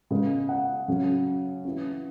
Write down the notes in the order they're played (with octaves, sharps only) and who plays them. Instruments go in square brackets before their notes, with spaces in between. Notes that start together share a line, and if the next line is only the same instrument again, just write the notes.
[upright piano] C#3 G#3 B3
F#5
C#3 F#3 C#4
E3 C#4